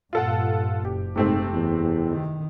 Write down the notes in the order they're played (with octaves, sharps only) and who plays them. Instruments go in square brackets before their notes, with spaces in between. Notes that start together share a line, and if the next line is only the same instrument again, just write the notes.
[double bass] G2 A#2 [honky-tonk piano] F4 A4 F#5
[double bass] F#1 [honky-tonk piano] G4
[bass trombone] G#2 [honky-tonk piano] C3 A3 C4
[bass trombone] E2
[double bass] D#3